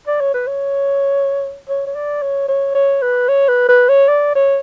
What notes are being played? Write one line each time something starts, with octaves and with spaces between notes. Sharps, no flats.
D5
C#5
B4
C#5
C#5
C#5
D5
C#5
C#5
C#5
B4
C#5
B4
B4
C#5
D5
C#5